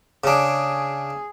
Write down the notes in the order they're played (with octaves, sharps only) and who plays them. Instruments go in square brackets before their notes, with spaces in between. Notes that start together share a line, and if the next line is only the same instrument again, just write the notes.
[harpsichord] C#3 D4 [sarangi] G#4